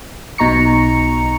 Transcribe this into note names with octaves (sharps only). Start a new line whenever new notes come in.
B1 B2 D#4 A#5 C#6 C#7